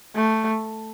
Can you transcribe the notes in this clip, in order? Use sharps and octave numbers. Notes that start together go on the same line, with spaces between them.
A3